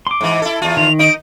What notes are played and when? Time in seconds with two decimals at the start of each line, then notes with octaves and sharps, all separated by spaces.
0.07 C6 D6
0.21 G#2 E3
0.42 E4 A4
0.62 E2 F4
0.77 D#3 F7
0.99 D#4 D#5 D7